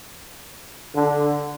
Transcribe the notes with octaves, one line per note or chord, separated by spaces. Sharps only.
D3